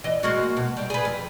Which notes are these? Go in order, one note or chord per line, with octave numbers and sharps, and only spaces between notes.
E3 D#5
G#3 A#3 F#4
B2
G3
G#4 B4
F2